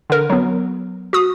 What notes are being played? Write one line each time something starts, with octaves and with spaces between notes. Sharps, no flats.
D3 A#4
F#3 B3
F#4 D#6